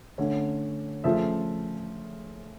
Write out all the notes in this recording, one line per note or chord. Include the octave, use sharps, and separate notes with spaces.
D3 A3 C#4
C#3 F3 A3 E5